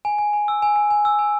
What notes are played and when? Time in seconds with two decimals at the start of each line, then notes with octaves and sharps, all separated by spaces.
0.05 G#5
0.18 G#5
0.33 G#5
0.48 E6
0.62 G#5
0.76 G#5
0.90 G#5
1.05 E6
1.19 G#5